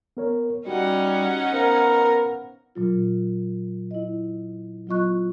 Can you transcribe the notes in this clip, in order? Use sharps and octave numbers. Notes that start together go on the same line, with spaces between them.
B3 A#4 C#5
G3 C#4 D#4 F#4 G4 F#5
B3 A#4 C5 F5
A#2 F#3 F4
E4 D#5
F#3 B3 F4 D#5 C#6 F#6